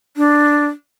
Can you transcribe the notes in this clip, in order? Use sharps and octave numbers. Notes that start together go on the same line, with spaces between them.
D4